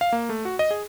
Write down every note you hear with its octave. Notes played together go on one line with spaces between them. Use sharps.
F5
A#3
A3
F#4
D#5
G#4